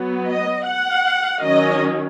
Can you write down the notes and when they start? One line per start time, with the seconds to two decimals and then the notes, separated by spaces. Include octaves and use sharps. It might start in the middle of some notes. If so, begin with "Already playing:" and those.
Already playing: F#3 B3
0.26 D#5
0.66 F#5
1.42 D#3 F#3 C#4 D#5